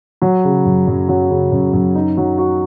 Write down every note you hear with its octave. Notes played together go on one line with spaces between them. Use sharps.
F#3
C#3
F#2
F#2
F#3
C#3
F#2
F#2
D#4
F#3
F#4